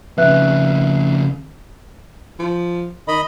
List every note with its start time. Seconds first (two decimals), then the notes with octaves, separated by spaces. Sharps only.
0.18 F2 C#3 B4 E5 F#6
2.39 F3
3.08 D#3 D#5 B5